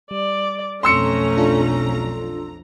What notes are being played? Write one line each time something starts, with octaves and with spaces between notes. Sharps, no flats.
G3 D5
B1 F2 A3 C#4 A#5 C6 E6 C#7
D4 F4 A4